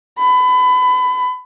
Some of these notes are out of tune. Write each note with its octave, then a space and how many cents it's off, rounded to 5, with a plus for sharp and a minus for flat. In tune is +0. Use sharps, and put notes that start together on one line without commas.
B5 +30